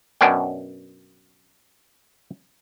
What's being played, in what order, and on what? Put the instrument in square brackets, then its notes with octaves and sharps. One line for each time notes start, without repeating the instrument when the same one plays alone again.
[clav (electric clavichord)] F#2 B2 C#4 D4 G5